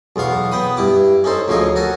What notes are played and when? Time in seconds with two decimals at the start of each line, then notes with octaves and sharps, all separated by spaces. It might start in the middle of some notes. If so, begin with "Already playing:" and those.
0.16 B1 E2 B3 F5 C#6
0.52 B3 G5 B5 D#6
0.77 G2 E4 D6
1.24 C#4 D#4 A4 C5
1.48 D2 C#3 F3 D#4 C#5 D#5
1.76 F#4 A4 A#4 G#5